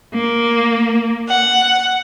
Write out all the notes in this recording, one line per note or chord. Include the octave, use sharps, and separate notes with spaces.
A#3
F#5